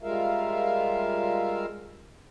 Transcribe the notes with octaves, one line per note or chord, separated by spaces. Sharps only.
G3 G#3 F4 A#4 E5 F5